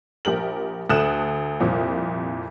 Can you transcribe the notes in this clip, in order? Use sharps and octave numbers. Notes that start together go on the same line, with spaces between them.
A#1 G4 A#4 F#7
D2 A4 D#6 F#6 E7
C2 F2 A#2